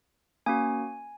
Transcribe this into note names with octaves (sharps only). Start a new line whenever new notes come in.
A#3 C#4 F#4 G#5